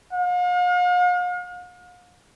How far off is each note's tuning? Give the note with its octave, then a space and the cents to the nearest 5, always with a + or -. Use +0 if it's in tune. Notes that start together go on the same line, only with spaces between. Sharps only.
F5 +45